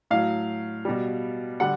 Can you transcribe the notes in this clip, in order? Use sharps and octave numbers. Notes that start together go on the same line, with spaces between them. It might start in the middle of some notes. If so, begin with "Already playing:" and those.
A2 F#3 F5
B2 G3
D3 G3 F#5